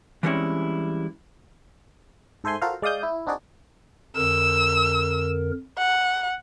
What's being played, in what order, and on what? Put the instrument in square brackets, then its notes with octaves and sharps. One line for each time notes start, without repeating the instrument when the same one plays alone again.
[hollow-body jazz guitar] E3 G3 G#3 C4 C#4 E4
[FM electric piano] G#2 A4 C5 E5 G#5 C6
F4 F#4 A4 A#4 C5 F5
G#3 D5 F5 D#6 G6
E4
C4 D4 D#4 F#4 G#4 D5
[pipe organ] F2 D3 A#4 [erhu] E6
[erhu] F#5